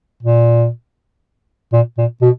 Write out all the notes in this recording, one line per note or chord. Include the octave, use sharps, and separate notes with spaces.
A#2
A#2
A#2
B2